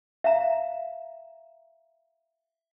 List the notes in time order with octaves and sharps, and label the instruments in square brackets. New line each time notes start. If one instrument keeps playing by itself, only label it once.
[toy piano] E5 F5 A#5